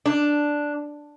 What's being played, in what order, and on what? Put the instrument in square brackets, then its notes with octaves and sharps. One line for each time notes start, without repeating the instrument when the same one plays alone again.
[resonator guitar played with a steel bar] D4